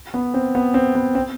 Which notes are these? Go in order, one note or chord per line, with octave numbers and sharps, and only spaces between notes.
B3
C4
B3
C4
B3
C4